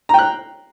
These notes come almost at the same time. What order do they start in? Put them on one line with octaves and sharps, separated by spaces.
A#5 G5 F#6